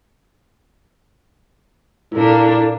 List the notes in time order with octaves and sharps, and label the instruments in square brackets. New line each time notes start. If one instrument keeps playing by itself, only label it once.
[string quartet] A#2 A#3 D4 [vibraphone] E4 A4